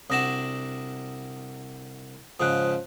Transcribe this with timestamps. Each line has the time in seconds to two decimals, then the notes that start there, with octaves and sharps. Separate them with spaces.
0.10 C2 D4 F#4 D#6 A#6 E7
2.40 G#2 C#3 F3 D#6 F#6